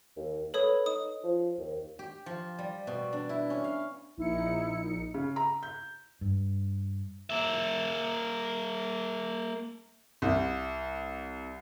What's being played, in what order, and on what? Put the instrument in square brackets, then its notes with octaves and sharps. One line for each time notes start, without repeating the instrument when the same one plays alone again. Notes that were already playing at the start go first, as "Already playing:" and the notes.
[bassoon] D#2
[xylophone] A4 C#5 D#6 [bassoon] B4
[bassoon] D#4 [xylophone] D#6
[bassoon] F3
D#2
[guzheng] G4
F3
G3
B2
D4
E4
C#4
F5
[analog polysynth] A#1 D#4 C#7 [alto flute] E4
[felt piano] C#3
A#5
G6
[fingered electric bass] G2
[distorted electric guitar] A#3 E5
[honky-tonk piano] C2